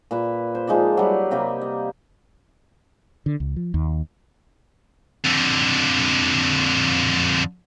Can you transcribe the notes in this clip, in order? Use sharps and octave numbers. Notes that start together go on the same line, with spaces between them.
A#2 B4 E5
C5
F3 G#3 D#4 D5
F#3 G3
C3 A#3 D#5 G5
D#5
D3
C#2
F3
D#2
F2 D3